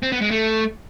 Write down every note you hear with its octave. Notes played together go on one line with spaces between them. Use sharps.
C4
B3
G#3
A3